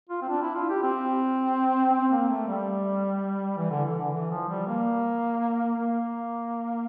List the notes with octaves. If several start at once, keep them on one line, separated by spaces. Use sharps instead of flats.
F4
C4
D4
E4
F4
G4
C4
C4
A#3
A3
G3
E3
D3
E3
D3
E3
F3
G3
A#3
A#3